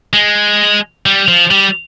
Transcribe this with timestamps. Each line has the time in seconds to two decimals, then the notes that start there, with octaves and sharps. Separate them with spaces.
0.13 G#3
1.06 G3
1.28 F3
1.51 G3